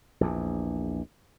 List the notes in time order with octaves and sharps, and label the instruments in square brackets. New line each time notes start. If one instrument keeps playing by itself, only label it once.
[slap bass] A#1 E2